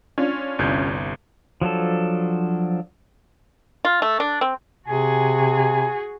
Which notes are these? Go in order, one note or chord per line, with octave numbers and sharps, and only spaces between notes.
C#4 D4 F4
G1 C2 G6
F3 F#3 D4 A4
F4
A3
D4
C4
C3 F#4 G#4 G#5